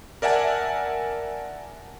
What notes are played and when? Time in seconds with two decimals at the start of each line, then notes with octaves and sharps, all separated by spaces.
0.22 A#4 D5 E5 F#5 G#5 A5